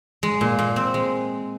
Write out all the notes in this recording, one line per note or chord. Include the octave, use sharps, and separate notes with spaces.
G#3
A#2
A#2
C4
G#3